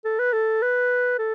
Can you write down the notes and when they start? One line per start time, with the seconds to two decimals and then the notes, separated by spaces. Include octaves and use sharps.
0.05 A4
0.19 B4
0.33 A4
0.62 B4
1.19 A4